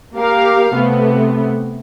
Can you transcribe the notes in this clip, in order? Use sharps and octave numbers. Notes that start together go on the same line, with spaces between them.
A#3 G4 A#4 F5
C3 A3 B3